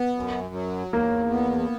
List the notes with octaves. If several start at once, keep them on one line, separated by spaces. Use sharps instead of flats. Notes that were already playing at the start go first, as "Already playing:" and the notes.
Already playing: B3
F#2
F#3
E2 A#3
B3